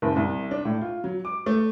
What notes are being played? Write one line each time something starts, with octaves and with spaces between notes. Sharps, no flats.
F#1
C2
D4
A2
F4
F#3
D6
A3